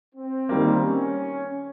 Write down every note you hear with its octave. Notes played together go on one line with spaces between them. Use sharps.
C4
D#3 G3 A#3
C#4